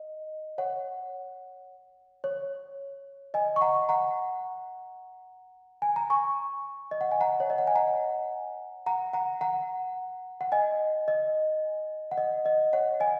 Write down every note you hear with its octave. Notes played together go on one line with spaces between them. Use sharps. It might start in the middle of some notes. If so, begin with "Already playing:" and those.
Already playing: D#5
C#5 F#5
C#5
D#5 G#5
C#6
F#5 A#5
F#5 A#5
G#5
A#5
G#5 C#6
D#5
F#5
G#5
F#5 A#5
C#5
D#5
F#5
G#5
F#5 A#5
F#5 A#5
F#5 A#5
F#5 A#5
F#5
D#5 G#5
D#5
F#5
D#5
D#5
C#5 F#5
D#5 G#5